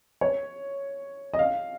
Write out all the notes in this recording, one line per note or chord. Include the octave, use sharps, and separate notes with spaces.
C#5
D#5
F5